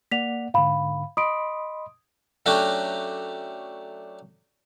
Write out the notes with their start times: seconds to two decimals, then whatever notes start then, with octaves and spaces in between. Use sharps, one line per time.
0.11 A#3 D5 F#5 B6 F7
0.54 G#2 D3 F5 B5
1.17 D#5 B5 C6 D#6 D7
2.46 F#3 A3 C#4 D4 F#4 G4